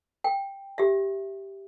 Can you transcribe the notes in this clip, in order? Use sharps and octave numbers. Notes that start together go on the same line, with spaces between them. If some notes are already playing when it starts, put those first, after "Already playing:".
G5
G4 E5